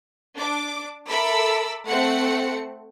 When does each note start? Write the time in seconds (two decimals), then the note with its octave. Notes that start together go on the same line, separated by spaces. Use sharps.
0.35 D4 D6
1.08 A4 A#4 E5 B5 D6 E6
1.87 A3 C4 F#5 C#7